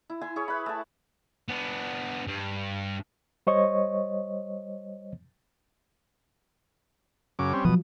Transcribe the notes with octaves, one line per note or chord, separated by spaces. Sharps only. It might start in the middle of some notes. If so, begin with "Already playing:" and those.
E4
E4 G#5 C6
E4 G#4 C#5
B4 E5 B5
A3 A5
B3 D4
G2
G3 C5 C#5 D#5 C#6
F#2 C#3 D6
G3 C4 C#4
B2 F3 F#3 D#6